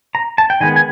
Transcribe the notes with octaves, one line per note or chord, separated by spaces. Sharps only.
A#5
A5
G5
D#3 G#3 B3 G#5
G#5